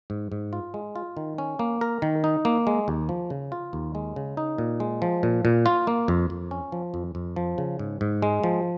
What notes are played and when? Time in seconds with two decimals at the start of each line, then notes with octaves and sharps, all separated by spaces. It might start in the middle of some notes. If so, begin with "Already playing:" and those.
0.10 G#2
0.32 G#2
0.53 F4
0.74 G#3
0.96 F4
1.17 D#3
1.38 C#4
1.59 A#3
1.81 A#4
2.02 D#3
2.24 D#4
2.45 A#3
2.67 G#3
2.88 D#2
3.09 F3
3.30 C#3
3.52 F4
3.73 D#2
3.95 G#3
4.16 C#3
4.37 D#4
4.58 A#2
4.80 G#3
5.02 F3
5.23 A#2
5.45 A#2
5.66 F4
5.87 A#3
6.08 F2
6.30 F2
6.51 C#4
6.72 F3
6.94 F2
7.15 F2
7.36 F3
7.58 C#3
7.79 G#2
8.01 G#2
8.22 G#3
8.44 F3